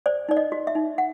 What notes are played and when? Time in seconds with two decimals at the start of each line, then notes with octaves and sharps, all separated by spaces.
0.06 C5 D5
0.29 D#4 D5
0.37 D#5
0.52 F#4
0.67 E5
0.75 D#4
0.98 F#5